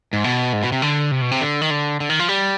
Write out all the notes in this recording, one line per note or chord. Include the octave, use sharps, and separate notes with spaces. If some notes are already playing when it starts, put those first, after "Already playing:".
G#2
B2
G#2
B2
C3
D3
C3
B2
C3
D3
D#3
D3
D3
D#3
F3
G3